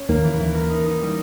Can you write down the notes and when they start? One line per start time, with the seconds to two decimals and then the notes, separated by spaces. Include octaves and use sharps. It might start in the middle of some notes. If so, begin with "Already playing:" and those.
Already playing: C#4
0.08 D#2 D#3 A#3
0.24 E3
0.40 E3
0.55 A#4
0.70 D#4
0.86 D#4
1.02 G3